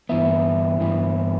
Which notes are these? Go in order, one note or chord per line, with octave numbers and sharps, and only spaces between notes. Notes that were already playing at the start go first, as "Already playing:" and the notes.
G2 E3 B3 E5
G2 E3 B3